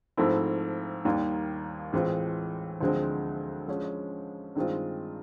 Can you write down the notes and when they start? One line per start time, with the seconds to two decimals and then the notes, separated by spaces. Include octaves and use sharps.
0.17 G#2 F3 A3 C4 E4
1.05 D#2 D#3 G3 A#3
1.92 A2 E3 G#3 C4 F4
2.81 D2 D3 F3 G#3 C4
3.68 F3 G#3 C#4
4.56 G2 D#3 G#3 C4 F4